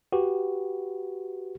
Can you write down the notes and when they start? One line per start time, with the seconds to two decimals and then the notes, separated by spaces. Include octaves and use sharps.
0.12 F#4 G4 B4